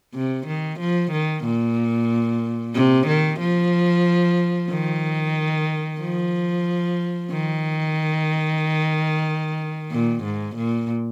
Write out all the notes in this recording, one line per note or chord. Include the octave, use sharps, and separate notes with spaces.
C3
D#3
F3
D#3
A#2
C3
D#3
F3
D#3
F3
D#3
A#2
G#2
A#2